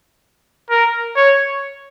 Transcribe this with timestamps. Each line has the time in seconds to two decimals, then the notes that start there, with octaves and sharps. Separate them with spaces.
0.70 A#4
1.16 C#5